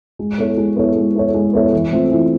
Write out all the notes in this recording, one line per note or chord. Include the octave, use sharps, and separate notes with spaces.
G#3
B3 E4 A4 C#5
G#3
B3 E4 A4 C#5
G#3
B3 E4 A4 C#5
G#3
B3 E4 A4 C#5
E3
A3 C4 F4
E3